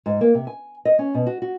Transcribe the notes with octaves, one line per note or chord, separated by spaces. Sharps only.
G#2
A#3
C3
G#5
D#5
C#4
B2
F#4
F#4